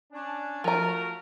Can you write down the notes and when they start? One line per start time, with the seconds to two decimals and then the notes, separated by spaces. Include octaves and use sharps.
0.13 C#4 D4
0.64 F3 A3 F#4 A#4 A#5